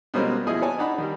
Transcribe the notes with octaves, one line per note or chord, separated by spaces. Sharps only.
B2 G3 G#3 A#3 C4 C#4
D#2 B2 F3 E4 G#4 D#5
C#5 D5 G#5 A5
D4 D#4 F#5 B5
D#3 G3